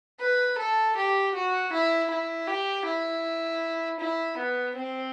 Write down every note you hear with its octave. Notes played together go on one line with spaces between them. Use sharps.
B4
A4
G4
F#4
E4
E4
G4
E4
E4
B3
C4